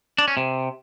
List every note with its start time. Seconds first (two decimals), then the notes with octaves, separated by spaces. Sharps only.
0.18 D4
0.28 C#4
0.37 C3